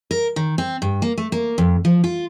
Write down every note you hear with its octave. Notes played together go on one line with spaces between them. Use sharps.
A#4
D#3
C4
G2
A#3
A3
A#3
F2
F3
F4